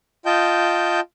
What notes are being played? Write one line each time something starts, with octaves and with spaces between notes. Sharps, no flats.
F4 D#5 G5 A5 G6